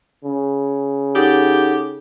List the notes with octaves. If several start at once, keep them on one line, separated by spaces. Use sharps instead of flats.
C#3
D#4 G4 A4 F#5